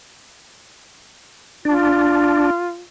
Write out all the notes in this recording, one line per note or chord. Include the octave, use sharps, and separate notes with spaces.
D4 F4